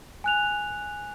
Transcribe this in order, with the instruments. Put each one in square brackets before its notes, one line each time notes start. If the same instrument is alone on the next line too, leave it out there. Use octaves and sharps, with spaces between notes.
[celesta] G#5 F#6 F7